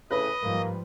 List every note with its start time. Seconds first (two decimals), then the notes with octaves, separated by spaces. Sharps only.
0.11 A2 C#3 B4 D#5
0.43 G#2 F3 G3 A#3